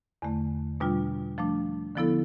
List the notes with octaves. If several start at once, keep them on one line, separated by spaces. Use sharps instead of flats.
E2 D3 A3
B2 G3 D4 F4
F3 A3 D4
D3 F3 B3 E4 A4